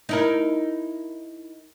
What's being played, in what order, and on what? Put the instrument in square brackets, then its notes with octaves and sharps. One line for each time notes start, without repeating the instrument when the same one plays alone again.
[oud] D#4 E4 A#4